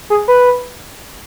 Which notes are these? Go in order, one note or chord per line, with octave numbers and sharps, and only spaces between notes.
G#4
B4